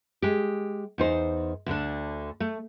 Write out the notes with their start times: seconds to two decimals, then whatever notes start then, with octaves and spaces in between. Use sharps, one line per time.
0.22 G#3 G4
0.98 E2 D#4 C5
1.66 D2 D3 D4
2.40 A3